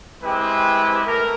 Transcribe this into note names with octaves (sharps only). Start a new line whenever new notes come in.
G#3 C4 E4 G4 B4
A3 A#4